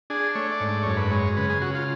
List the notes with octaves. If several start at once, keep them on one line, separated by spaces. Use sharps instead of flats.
D4 G#4
A3 C#5
D5
G#2
D5
F#2 C#5
B4
G#3 C#5
C#3 B4
G#4
C#3 F#4
F4